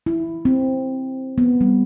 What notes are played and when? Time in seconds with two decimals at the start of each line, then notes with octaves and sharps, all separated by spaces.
0.06 E4
0.45 C4
1.38 B3
1.61 G3